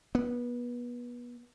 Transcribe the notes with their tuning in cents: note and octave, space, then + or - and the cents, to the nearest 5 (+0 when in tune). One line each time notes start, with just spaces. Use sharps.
B3 -25